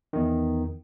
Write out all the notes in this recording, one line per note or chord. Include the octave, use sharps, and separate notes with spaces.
E2 D#3